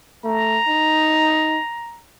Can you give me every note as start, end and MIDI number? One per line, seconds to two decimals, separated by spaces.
0.24 0.58 57
0.24 2.00 82
0.68 1.58 63